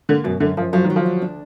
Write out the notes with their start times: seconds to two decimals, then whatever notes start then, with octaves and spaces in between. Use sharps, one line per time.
0.09 D3 A#3
0.24 F#2 B2
0.40 F#2 D3
0.57 F#2 F3
0.73 F3 F#3
0.84 D#3
0.90 F#3
0.96 F3
1.06 D2
1.22 D4